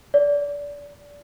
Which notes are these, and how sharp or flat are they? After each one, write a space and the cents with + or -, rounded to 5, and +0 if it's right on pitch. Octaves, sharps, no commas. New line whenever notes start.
D5 -25